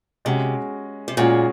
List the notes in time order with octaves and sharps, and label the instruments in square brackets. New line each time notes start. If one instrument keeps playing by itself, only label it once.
[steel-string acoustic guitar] C3 [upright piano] G#3 C#4 F#4
[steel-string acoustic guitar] C3
[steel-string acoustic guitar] A#2 [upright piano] G#3 C#4 F#4